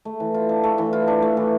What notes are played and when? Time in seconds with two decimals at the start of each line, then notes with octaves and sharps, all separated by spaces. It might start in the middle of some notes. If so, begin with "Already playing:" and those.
0.05 A3
0.20 E3
0.34 F4
0.49 D4
0.64 A3
0.78 E3
0.93 F4
1.08 D4
1.22 A3
1.37 E3